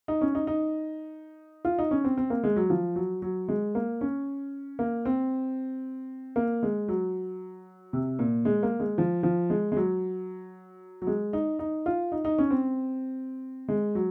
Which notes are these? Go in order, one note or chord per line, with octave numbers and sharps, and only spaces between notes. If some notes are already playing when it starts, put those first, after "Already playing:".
D#4
C#4
D#4
D#4
F4
D#4
C#4
C4
C4
A#3
G#3
F#3
F3
F#3
F#3
G#3
A#3
C#4
A#3
C4
A#3
G#3
F#3
C3
A#2
G#3
A#3
G#3
F3
F3
G#3
G#3
F#3
F#3
G#3
D#4
D#4
F4
D#4
D#4
C#4
C4
G#3
F#3